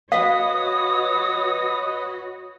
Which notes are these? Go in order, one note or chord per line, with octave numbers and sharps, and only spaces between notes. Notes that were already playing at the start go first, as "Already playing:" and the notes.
F#4 B4 C#5 D#5 F5 D#6